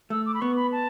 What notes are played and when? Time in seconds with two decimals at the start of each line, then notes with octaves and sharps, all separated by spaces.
0.10 A3 E6
0.26 D6
0.34 B5
0.41 B3 C#6
0.56 B5
0.72 A5